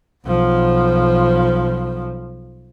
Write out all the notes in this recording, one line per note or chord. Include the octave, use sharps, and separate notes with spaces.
B1 F3